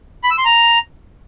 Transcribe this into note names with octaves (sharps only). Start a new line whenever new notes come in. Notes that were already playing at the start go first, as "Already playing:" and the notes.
B5
E6
C6
A#5